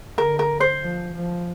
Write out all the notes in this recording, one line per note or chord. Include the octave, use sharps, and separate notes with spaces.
D3 A#4
A#4
C5
F3
F3